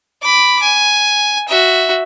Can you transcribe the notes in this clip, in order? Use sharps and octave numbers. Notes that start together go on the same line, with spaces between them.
B5 D6
G#5
F#4 E5